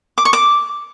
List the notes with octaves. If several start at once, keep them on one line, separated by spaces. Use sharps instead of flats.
D6
C#6
D6